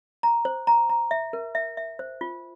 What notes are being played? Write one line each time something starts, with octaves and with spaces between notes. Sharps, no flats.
A#5
C5
A#5
A#5
E5
A#4
E5
E5
C5
F4